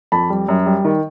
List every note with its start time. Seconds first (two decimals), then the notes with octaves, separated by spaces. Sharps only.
0.12 F2 A5 B5
0.30 G3
0.48 F#2
0.66 G3
0.85 D#3